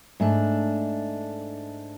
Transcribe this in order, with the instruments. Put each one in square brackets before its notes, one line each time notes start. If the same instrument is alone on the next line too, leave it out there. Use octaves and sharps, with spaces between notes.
[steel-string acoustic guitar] G#2 A3 D4